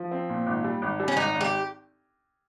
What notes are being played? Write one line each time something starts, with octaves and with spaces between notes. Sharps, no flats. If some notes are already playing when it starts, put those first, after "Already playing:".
Already playing: F3
C4
A#2
G#1
G3
G#1
G3
C#4
G#1 D#4
G#1
G4